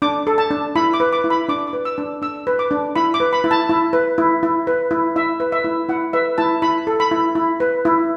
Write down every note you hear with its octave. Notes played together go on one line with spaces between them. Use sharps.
D4 D6
A4
A5
D4
E4 B5
D6
B4
D6
E4
B5
D4 D6
D6
B4
E6
D4
D4 E6
B4
D6
D4
E4 B5
D6
B4
B5
E4
A5
E4
B4
E4
E4
B4
E4
E4 E5
B4
E5
E4
E4 F#5
B4 E5
E4 A5
E4 B5
A4
B5
E4
E4
B4
E4